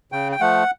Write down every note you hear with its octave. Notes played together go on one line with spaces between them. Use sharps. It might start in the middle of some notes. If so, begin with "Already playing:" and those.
C#3 G5
G5
F3 A3 F#5